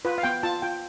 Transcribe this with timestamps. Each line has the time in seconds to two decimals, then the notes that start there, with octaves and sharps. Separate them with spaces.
0.05 F4 B4
0.18 F5
0.23 B3 G5
0.43 F4 A5
0.62 F4 G5